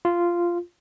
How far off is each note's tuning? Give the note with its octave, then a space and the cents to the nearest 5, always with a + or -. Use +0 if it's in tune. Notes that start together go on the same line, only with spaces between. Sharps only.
F4 -10